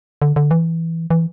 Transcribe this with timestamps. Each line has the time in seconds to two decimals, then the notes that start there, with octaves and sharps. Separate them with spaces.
0.22 D3
0.36 D3
0.51 E3
1.10 E3